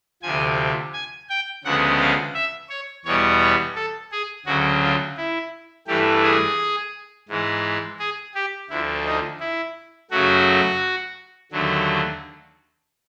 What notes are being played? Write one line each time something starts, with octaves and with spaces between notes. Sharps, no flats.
D2 C3 F3 G#5
G#5
G5
D2 C#3 F3 G#3 B3 F#5
F5
E5
C#5
E2 B2 G3 B3 C#5
C#5
A4
G#4
D2 C#3 F#3 F#4
F4
E4
G2 E3 A3 G4
G#4
G#2 E3 G#3
G#4
G4
D2 D3 F3 E4
D#4
E4
F#2 C#3 F#3 A3 F#4
D#2 D3 F#3 A3